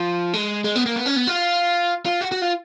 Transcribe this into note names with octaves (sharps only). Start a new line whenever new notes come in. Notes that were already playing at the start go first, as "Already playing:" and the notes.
Already playing: F3
G#3
G#3
B3
A#3
B3
C#4
B3
F4
F4
F#4
F#4
F4